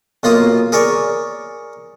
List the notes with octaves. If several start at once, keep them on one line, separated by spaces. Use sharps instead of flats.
B1 A#3 F4 D#6
G#4 A#4 C#5 D5